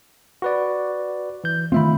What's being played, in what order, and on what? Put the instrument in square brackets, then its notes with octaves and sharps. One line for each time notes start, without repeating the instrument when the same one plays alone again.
[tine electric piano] F#4 B4 D5
E3 G6
[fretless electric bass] D#3 A3 C4 [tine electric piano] F4 E5 B5